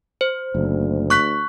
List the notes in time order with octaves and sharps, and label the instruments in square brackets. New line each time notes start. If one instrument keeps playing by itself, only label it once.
[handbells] C5
[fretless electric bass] F#1 [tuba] D2
[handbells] C#6 F#6 B6